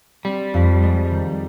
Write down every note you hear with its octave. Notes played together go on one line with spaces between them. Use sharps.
G3 C4
F2
G#3
D#3